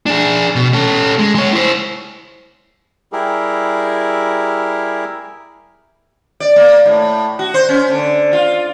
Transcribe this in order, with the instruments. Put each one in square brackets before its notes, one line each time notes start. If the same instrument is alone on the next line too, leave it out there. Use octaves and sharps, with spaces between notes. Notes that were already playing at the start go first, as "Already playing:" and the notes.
[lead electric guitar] D4 G#4
B2
C#4 A4
G#3
G#3 C#5
E4 C5
[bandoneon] G3 E4 G4 G#4 A#4
[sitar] D5
A#3
A2
F#4
C5
C#4
D3
F4